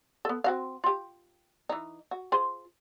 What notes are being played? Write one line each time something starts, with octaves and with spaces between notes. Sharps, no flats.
B3 A4
C4 F#4 F5
F4 G4
E3 D#4
F#4
F4 G#4 C5